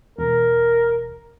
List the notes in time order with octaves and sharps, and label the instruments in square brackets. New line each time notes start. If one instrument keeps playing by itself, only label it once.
[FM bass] E1 [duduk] A#4